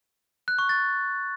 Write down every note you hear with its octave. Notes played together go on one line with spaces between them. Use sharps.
F#6
C#6
A6